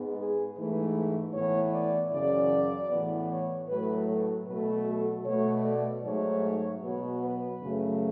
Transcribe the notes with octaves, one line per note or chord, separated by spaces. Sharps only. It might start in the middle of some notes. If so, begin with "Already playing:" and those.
Already playing: G#2 G#3 B3
G#4
G#2 E3 A3 B4
A2 E3 B3 C#5
D5
F#2 C#3 E3 D5
A2 E3 B3
C#5
A2 F#3 A3 B4
A4
B2 F#3 A3 B4
A4
B2 A3 C#5
D5
G#2 F#3 A3 C#5
B2 F#3 B3
B4
F#2 C#3 F#3 A3